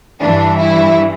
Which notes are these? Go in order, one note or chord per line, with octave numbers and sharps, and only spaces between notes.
G2 E3 D4
E4